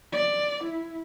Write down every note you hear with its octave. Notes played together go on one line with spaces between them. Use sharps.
D5
E4